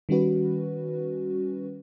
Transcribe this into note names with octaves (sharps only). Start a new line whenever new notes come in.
D#3 G3 C#4 F#4 B4